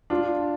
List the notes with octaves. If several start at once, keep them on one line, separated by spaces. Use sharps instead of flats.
D4 F4